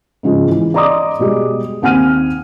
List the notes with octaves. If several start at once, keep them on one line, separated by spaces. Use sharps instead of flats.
G#2 C#3 F3 G#3
E3
D5 D#5 A#5 C6 D6 D#6
B2 G3 G#3
D#2 C4 F#5 G#5 F6 D#7